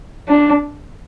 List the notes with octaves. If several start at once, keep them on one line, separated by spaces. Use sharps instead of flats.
D4